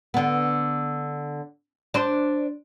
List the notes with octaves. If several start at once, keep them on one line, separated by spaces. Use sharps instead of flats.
D3 B3
D4 C5